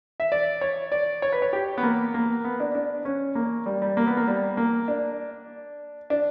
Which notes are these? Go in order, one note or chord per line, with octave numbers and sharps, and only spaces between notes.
E5
D5
C#5
D5
C#5
B4
C#5
G4
B3
A#3
A#3
B3
D4
D4
C#4
A#3
G3
G3
A#3
B3
A#3
G3
A#3
D4
D4